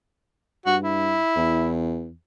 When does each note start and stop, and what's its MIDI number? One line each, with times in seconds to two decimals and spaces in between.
0.66 1.19 43
0.66 0.76 66
0.83 1.75 64
1.36 2.12 40